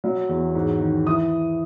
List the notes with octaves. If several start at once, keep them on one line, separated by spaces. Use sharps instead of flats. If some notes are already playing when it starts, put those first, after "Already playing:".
F#3
E2
G#2
D#3
E3 D#6